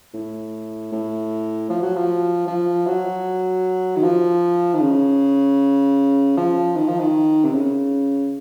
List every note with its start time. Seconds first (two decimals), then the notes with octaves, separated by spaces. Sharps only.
0.14 A2
0.92 A2
1.70 F3
1.82 F#3
1.96 F3
2.47 F3
2.87 F#3
3.96 D#3
4.03 F3
4.74 D#3
4.81 C#3
6.37 F3
6.76 D#3
6.88 F3
6.99 D#3
7.44 C3
7.54 C#3